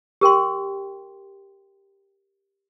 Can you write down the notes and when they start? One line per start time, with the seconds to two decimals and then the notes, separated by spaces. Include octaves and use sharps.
0.21 G4 A#4 G5 C6